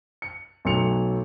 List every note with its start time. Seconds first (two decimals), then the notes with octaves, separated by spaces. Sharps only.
0.22 C#7
0.65 B1 F#3 A3 C#7 F7